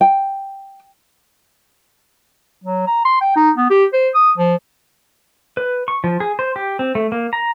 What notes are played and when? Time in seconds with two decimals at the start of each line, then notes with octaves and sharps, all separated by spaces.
0.01 G5
2.64 F#3
2.87 A#5
3.05 C6
3.21 G5
3.36 D#4
3.57 B3
3.70 G4
3.93 C5
4.15 D#6
4.38 F3
5.57 B4
5.88 C#6
6.04 F3
6.20 G#4
6.39 C5
6.56 G4
6.79 C4
6.95 A3
7.12 A#3
7.33 A#5